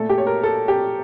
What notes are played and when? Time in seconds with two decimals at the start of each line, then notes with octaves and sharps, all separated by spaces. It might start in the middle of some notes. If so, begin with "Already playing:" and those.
Already playing: A#2 A3 A4
0.09 G4
0.18 C#5
0.27 A#4
0.43 A4
0.68 G4